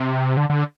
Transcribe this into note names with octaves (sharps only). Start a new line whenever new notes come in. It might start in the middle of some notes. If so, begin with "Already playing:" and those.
Already playing: C3
D3
D3